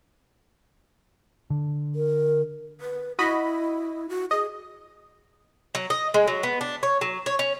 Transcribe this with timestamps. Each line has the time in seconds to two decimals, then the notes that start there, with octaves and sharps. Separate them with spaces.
1.50 D3
1.95 A#4
2.81 B4
3.19 E4 F#4 D#5 B5
4.09 F#4
4.31 G#4 D#5
5.75 F#3
5.90 D#5
6.14 G#3
6.28 F#3
6.43 B3
6.61 D4
6.83 C#5
7.01 F#3
7.26 C#5
7.39 C#4